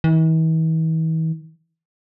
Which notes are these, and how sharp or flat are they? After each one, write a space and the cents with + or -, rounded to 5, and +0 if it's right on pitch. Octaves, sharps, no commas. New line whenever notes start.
E3 -45